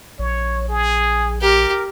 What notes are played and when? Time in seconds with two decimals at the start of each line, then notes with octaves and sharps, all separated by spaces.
0.19 A#1 C#5
0.69 G#4
1.41 G4 A#4